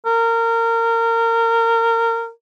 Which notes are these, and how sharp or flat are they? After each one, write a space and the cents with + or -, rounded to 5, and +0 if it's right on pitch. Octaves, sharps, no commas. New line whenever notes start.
A#4 -25